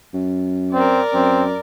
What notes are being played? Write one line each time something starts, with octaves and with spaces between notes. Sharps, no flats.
F#2
C4 A#4 D5
F#2 C4